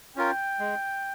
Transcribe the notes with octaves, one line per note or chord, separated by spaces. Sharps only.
C#4 F4 A#4 G5
G#3